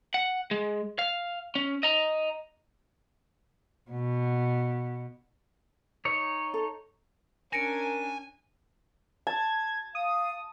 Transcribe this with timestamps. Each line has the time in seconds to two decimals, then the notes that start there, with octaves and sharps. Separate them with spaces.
0.14 F#5
0.51 G#3
0.99 F5
1.55 C#4
1.83 D#5 A#5
3.91 B2
6.05 D#4 C#5
6.54 A4
7.53 C#4 D4 A#4 G#5 A#6 C#7 D7
9.27 A5 G#6
9.95 F5 D#6